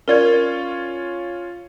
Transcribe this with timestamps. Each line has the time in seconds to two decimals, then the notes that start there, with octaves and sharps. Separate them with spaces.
0.08 C#4 F4 A#4 C#5 D5 G#6